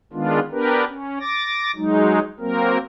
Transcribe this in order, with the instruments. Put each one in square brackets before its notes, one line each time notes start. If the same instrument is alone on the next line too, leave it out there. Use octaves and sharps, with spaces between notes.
[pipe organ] D#3 G#3 B3 D4 F4
B3 D4 G4 A#4 B4
C#4
D6 A6 A#6
F#3 G#3 D#4
F#3 A#3 C4 A#4